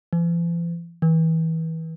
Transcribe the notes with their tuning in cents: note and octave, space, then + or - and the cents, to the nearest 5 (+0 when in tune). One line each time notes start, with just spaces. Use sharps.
E3 +45
E3 -30